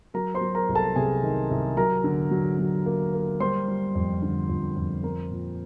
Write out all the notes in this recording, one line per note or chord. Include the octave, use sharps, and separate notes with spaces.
F#3 A#4 A#5
C5 C6
F#3
A#4 A#5
C2
A4 A5
C3 G#4 G#5
D#3
C2
F#3 A#4 A#5
D3
F#3
F#3
A#3
A#3
G3 C5 C6
G3
F2
D3
F2
F2
C4 A#4 A#5
A#2